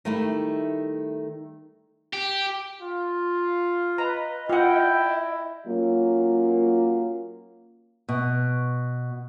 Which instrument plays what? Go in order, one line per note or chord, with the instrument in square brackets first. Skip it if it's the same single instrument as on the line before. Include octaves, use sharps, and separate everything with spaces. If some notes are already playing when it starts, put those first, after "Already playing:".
[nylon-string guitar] D#3 G3 A3 D#4 E4
[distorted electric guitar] G4
[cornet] F4
[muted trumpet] B4 [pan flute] D#5 [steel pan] A#5
[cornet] E4 [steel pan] F4 F#5 [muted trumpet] G5
[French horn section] F#3 A#3 C#4 F4
[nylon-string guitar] B2